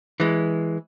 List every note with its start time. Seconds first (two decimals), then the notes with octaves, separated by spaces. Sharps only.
0.20 E3 G#3